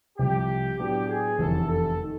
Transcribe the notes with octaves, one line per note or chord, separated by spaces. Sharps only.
C2 C3 F3 G4
A2 F#3 B3 D4 G4
G#4
F1 E2 C3 E3 A3 A4
A4
D#3